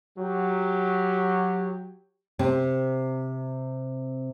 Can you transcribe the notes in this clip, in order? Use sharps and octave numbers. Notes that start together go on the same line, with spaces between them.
F#3 G4
C3 C4